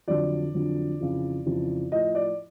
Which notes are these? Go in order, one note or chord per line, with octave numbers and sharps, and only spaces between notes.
F2 D3 F#3 D5
F2 D3 F#3
F2 C#3 E3
F2 C#3 E3
A2 F3 D#5
D5